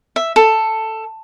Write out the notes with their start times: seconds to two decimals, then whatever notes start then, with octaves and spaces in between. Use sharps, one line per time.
0.16 E5
0.36 A4